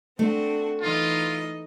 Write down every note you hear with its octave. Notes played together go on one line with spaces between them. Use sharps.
A3 C4 D4 F#4
E3 D#4 F4 D#5